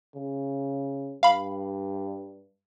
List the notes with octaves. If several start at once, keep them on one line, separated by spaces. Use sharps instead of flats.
C#3
G2 F5 B5